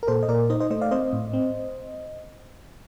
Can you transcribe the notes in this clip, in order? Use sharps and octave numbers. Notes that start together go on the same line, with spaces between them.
A#4
A#2 A4 C5
D#5
A#2 A#4 D5
D#4 C5 D#5
C5 D#5
A3 C5 D#5
D5 F5
C4 C5 D#5
A2
C4